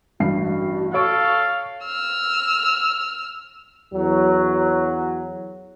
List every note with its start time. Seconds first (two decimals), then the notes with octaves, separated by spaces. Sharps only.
0.20 A1 G2 F#4 C7
0.94 A4 C#5 F5 C#6 D7
1.85 E6 F6
3.94 E2 F#3